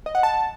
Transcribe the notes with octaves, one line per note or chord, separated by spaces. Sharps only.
D#5
F#5
A5